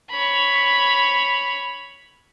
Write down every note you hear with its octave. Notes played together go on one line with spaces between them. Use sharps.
C#5 B5